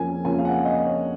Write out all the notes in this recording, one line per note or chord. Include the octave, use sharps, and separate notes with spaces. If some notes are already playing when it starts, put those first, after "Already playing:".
Already playing: F2 C#3 F3 A#3 C#4 G#5
F2 C#3 F3 A#3 C#4 G#5
F5
F#5
D#5
C#5